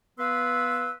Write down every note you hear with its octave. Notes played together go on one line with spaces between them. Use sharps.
B3 B4 F5 C6 E6